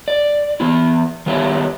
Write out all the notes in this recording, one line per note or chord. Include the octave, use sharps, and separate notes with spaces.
D5
E3 B3 E4
D#3 G3 B3 E4 C#5